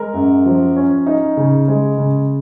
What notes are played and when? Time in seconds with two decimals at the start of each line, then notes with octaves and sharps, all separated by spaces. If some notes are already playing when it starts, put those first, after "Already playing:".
Already playing: G#3 A#4
0.14 F#2
0.46 F3
0.76 C#4
1.07 D#4
1.37 C#3
1.68 G#3
1.98 C#3